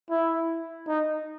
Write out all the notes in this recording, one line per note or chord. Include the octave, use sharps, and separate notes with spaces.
E4
D#4